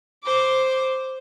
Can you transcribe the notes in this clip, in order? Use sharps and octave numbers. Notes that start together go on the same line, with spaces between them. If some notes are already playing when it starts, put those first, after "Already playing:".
C5 D6